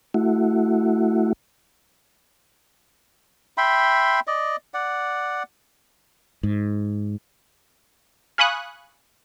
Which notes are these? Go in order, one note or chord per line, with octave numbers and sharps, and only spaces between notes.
A3 E4 F#4
E5 G5 B5 C6
D5 D#5
D5 F#5
G#2
F5 G#5 B5 C#6 D#6 F#6